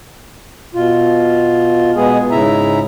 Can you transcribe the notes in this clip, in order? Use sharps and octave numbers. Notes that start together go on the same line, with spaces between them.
B2 F4
B2 G#3 B3 G#4
G#2 C#3 E4 E5 A#5